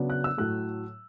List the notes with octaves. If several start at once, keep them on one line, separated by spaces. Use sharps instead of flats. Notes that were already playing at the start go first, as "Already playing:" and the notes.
Already playing: C#3 F#3 B3 D4
F#6
E6
A2 F#3 A3 F#6